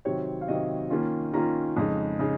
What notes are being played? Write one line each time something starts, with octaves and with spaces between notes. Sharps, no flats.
C3 D#3 F#3 C4 C#5
F5
C3 D#3 F#3 C4 D#5
D#3 A#3 C#4 F4
D#3 A#3 C#4 F4 A#5
F2 C#3 G#3 D#4
C#3 G#3 D#4